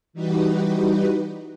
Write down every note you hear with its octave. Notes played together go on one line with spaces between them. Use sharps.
E3 G3 D#4 F#4 G4 B4